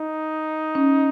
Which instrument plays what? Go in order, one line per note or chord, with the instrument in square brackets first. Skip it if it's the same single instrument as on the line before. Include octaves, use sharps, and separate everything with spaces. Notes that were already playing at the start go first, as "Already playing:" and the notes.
Already playing: [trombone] D#4
[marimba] C#4